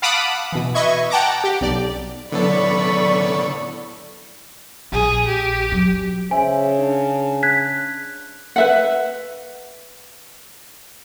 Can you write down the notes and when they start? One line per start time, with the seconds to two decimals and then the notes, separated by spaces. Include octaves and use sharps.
0.02 F5 F#5 A5 B5 D6 D#6
0.52 B2 E3
0.74 B4 D#5 E5 C#6 G#6
1.10 F#5 G5 A5 A#5 D6
1.44 G4
1.61 B1 D5
2.32 A2 D3 F#3 B3 A4 D5 B5 C#6
4.92 A#1 G#4
5.27 G4
5.72 F#3
6.31 C#3 C5 E5 G#5
6.79 D4 A5
7.43 F#6 G#6 B6
8.56 B4 E5 F#5